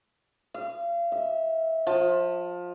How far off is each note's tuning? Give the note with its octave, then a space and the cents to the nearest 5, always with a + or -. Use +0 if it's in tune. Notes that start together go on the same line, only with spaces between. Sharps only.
F5 -35
E5 -25
F3 +20